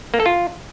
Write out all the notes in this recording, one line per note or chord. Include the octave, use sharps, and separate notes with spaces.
A#3
A4
F4